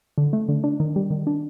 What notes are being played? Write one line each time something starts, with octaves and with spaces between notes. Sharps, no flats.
D3
A3
D3
D4
D#3
G3
D#3
D4